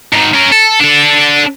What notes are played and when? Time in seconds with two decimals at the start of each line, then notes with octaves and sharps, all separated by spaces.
0.13 G#2 D#3
0.34 C#4 A#4
0.52 A4
0.80 D4 A4